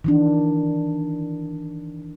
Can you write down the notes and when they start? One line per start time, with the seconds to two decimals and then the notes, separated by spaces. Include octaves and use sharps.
0.04 D#3 E3 D4